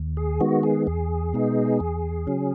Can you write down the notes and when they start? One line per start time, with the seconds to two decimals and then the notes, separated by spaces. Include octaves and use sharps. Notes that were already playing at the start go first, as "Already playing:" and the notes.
Already playing: D#2
0.17 G#4
0.40 D#3 G#3 B3 F#4
0.63 G#4
0.87 E2 G#4
1.33 B2 G#3 B3 D#4
1.80 E2
2.27 C#3 F#3 C#4